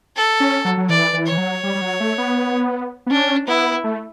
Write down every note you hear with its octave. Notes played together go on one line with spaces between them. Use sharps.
A4
C#4
F#3
F#3
E3 D5
E3
C#5
E3
F#3
G3
G3
F#3
A3
B3
B3
C#4 D4
B3 E4
A3